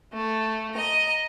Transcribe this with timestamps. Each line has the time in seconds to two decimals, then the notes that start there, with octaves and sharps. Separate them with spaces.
0.13 A3
0.74 D#5 A#5